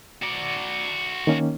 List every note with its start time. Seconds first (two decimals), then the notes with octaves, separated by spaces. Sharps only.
0.23 F#4 D5
1.27 D#3 A#3 C#4